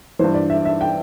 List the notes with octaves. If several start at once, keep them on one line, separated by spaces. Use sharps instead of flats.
G2 E3 C5
D5
E5
E5
G5